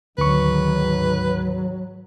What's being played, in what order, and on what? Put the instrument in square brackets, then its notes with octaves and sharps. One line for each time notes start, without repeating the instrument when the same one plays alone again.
[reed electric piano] D2 C#6 [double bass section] G#2 D#3 [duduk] F#3 [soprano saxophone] B4